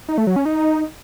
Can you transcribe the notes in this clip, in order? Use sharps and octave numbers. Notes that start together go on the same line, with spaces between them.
D#4
A3
F#3
C#4
D#4